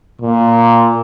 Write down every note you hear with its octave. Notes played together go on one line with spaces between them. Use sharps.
A#2